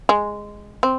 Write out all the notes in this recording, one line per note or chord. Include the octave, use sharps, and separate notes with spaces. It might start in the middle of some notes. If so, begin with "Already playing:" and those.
G#3
C4